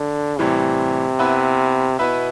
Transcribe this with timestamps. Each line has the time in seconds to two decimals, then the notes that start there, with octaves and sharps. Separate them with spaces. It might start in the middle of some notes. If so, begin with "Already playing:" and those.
Already playing: D3
0.39 A2 C3 E3 G3
1.19 B3 E4 B4 E5
1.99 B2 B3 E4 B4 E5